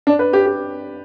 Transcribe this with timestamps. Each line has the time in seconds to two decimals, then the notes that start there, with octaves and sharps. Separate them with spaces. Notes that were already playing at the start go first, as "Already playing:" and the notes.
0.07 D4
0.19 B4
0.33 G4
0.46 G4